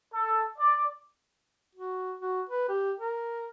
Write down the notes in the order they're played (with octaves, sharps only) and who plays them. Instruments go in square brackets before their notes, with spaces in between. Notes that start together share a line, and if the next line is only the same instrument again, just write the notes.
[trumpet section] A4
D5
[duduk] F#4
F#4
B4
G4
A#4